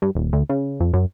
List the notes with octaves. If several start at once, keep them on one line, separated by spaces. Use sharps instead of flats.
G2
D#1
D2
C#3
F2
F#2